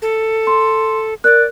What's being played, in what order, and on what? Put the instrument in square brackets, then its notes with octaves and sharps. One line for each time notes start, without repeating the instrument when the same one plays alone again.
[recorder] A4
[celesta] C6
[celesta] A#4 F#6 [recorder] D5